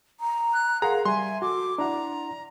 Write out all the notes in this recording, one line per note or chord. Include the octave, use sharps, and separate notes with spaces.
A#5
F#6
G#4 A#4 F5 F#5 A#5 C6
G3 E5 G#5 C6
F#4 A4 D6
D4 E4 D5 F#5 A#5